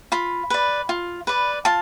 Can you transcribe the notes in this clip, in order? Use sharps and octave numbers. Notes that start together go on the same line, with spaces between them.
F4 B5
B4 D5
F4
B4 D5
F4 A5